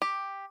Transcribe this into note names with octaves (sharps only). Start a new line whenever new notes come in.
G4